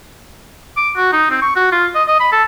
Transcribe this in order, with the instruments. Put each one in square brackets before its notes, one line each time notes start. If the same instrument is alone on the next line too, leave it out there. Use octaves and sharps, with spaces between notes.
[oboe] D6
F#4
D#4
C4
C#6
F#4
F4
D#5
D#5
B5
A4